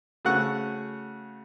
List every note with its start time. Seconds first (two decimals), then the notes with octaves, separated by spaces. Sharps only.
0.25 C#3 A3 F#4 F#5 C#6